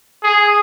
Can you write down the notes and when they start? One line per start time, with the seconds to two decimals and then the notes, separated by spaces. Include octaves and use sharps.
0.23 G#4